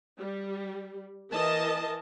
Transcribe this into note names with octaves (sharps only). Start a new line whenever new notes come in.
G3
E3 A#4 D#5 A5